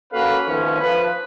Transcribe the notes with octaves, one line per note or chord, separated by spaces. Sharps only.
A#3 C#4 F#4 A4 B4 F5
D#3 F3 A3 B3 C#4
F3 B4